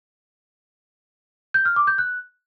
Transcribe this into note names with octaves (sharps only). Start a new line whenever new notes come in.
G6
F6
D6
G6
F#6